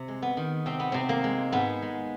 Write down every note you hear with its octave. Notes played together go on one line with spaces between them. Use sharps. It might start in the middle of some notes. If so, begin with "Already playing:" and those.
Already playing: C3
G#3
B3
D#3
C3 C4
B3
C3 C4
A#3
G#3
G#2 B3
G#3